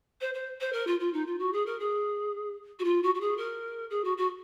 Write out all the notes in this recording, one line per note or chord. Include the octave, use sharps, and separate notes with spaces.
C5
C5
C5
A#4
F4
F4
D#4
F4
F#4
G#4
A#4
G#4
F#4
F4
F#4
F#4
G#4
A#4
G#4
F#4
F#4